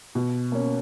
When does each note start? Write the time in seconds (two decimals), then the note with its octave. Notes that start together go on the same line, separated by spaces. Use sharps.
0.15 B2
0.52 A#3 C#4